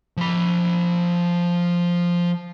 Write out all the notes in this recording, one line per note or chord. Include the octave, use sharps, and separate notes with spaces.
F3 B5